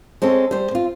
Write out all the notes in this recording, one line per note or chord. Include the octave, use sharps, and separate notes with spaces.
G#3 C4 C#4 A4
G3 C5
C4 F4